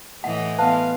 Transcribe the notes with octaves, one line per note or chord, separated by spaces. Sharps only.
A2 E3 D#5 F#5
B3 B4 F5 A5